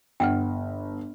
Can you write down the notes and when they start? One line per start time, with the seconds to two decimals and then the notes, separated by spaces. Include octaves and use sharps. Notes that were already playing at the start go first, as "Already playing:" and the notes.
0.20 G1 B4 F#5 G5